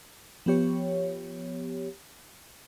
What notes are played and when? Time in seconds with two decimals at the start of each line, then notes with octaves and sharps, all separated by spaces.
0.46 F3 B3 G4 C#5